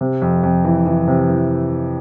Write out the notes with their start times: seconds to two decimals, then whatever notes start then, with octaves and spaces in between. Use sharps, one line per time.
0.01 C3
0.22 F2
0.43 F2
0.65 E3
0.86 E3
1.08 C3
1.30 E3